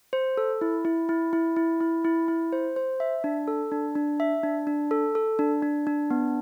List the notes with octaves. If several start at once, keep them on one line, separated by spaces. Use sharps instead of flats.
C5
A4
E4
E4
E4
E4
E4
E4
E4
E4
C5
C5
E5
D4
A4
D4
D4
E5
D4
D4
A4
A4
D4
D4
D4
B3